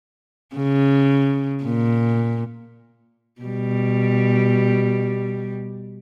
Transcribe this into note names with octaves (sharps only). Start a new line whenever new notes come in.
C#3
A#2
B2 G3